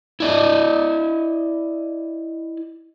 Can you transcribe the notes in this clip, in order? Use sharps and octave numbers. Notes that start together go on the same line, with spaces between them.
E4 D5 D#5